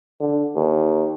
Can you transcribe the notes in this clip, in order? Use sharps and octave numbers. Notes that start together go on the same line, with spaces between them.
D3
D#2